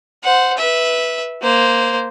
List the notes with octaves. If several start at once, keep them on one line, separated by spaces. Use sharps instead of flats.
C5 F#5
B4 E5
A#3 C5